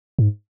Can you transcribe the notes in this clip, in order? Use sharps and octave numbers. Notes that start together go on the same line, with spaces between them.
G#2